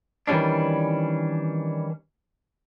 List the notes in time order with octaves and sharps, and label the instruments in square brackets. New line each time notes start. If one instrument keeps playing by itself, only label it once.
[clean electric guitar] D#3 E3 G3 C#4 D4